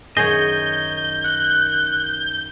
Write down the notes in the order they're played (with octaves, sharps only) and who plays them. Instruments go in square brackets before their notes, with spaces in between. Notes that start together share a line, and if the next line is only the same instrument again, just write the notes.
[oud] F#2 D#3 G#4 [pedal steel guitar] C#5 D#5 [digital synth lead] G6
[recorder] F#6